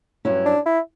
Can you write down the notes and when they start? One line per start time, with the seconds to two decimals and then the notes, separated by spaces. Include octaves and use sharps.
0.25 G2 F#3 C#4 E4
0.46 D4
0.66 E4